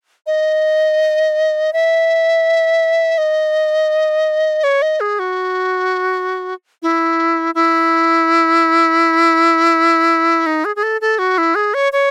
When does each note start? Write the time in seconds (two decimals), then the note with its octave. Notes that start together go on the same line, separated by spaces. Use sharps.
0.27 D#5
1.73 E5
3.18 D#5
4.64 C#5
4.82 D#5
5.00 G#4
5.19 F#4
6.83 E4
7.55 E4
10.46 D#4
10.65 G#4
10.76 G#4
10.83 A4
11.01 A4
11.19 F#4
11.38 E4
11.55 G#4
11.74 C#5
11.93 C#5